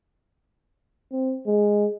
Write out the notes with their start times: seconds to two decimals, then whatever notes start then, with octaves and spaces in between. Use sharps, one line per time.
1.12 C4
1.47 G#3